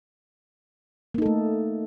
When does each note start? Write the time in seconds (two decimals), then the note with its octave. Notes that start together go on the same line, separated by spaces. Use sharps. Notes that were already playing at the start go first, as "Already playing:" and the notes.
1.14 A#3
1.18 D#4
1.22 A4
1.26 A3